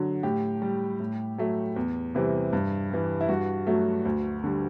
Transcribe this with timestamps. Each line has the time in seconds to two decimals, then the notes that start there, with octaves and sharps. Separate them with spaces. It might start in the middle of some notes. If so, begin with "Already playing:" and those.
Already playing: D3 F#3
0.23 A2 G4
0.62 G3
1.00 A2
1.38 F#3 A3
1.76 E2
2.15 C3 E3 G3
2.53 G2
2.90 E3 G3
3.21 E4
3.29 G2 F#4
3.67 F#3 A3
4.05 D2
4.44 D3 G3